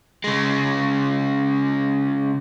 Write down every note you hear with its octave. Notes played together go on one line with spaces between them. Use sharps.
C#3 G#3